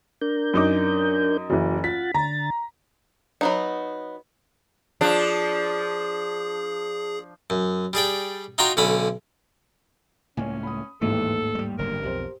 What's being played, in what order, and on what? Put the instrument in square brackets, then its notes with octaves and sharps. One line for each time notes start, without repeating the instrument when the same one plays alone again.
[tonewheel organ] D4 A#4 G6
[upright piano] F#2 D#4 D6
[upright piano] F#1 E3 [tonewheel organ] F#4
[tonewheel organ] F4 F#5 A6 [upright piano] B6
[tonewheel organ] D3 A6 [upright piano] A#5
[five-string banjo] F#3 B3 D#4
[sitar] F3 D4 [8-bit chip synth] G#4
[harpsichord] F#2
G3 G#4 D5 G5
D#4 F4 F#4 G5 A#5 C6
B1 D3 C#4 B5
[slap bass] C#2 A2 A#3 [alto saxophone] C#4 [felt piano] C#5 G#5
[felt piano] B5 D#6
[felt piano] A1 D#2 G#2 [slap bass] E3 [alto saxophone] A4
[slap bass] G3 G#3
[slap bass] F#1 D3 G3 [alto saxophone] A#4
[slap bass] B1 F2 [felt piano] G4 C5